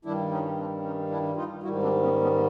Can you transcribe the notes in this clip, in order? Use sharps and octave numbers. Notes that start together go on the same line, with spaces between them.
G2 D#3 G3 D4 E4
C#4 D#4
C4 D4
C#4 D#4
D4 E4
D#4 F4
G#2 D#3 G3 E4 F#4
C4 D4
B3 C#4
B3 C#4